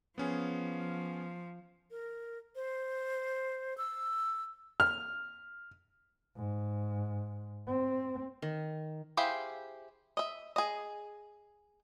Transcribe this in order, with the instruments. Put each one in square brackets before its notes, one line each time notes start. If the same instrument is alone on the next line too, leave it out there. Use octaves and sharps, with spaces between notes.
[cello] F3 [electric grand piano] B3 C#4 G#4
[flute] A#4
C5
E6
[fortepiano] F6
[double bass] G#2
C4
[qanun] D#3
[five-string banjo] E4 G4 G#4 C5 F5
D#5 E5
G#4 D#5